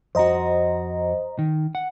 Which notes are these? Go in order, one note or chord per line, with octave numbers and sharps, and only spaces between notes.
F2 F#4 C5 D#5 A#5
D#3
F#5